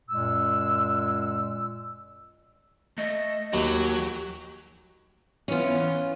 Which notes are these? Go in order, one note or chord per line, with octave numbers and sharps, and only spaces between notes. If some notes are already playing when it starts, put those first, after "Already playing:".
F#2 A#2 G#3 E6
A3 D#5
D#2 F#3 F#4 G4
E3 B3 C#4 F4